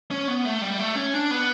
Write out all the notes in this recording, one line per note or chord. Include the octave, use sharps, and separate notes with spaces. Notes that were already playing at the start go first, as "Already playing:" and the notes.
C#4
B3
A3
G3
A3
C#4
D4
B3